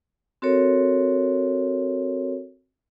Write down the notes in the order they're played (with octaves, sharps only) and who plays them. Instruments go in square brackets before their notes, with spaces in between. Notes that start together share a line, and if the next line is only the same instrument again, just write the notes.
[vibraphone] C4 F#4 A4 A#4 C#5